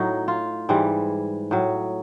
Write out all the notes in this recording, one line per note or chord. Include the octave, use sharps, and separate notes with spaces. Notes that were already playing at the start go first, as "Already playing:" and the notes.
Already playing: A2 F#3 D#4
F4
G#2 E3 G3
A2 F#3